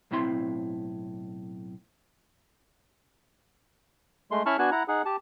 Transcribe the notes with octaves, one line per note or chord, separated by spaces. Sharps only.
B1 A2 C4 E4 A#5 C6
G#3 A3 C6
C#4 E4 A5 B5 C#6 F6
B3 D4 F#4 G#5 A5 F#6
E4 F#5 A#5
D#4 G#4 F#5
G4 A5